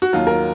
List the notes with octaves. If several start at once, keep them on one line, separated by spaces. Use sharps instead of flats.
F#4
D#2 D#3 F#3 F4
A#4